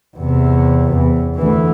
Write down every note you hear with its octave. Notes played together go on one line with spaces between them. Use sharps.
E2 C3
E2
D2 E3